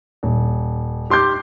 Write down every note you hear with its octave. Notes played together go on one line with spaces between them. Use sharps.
D#1
G4 C6 D6 G6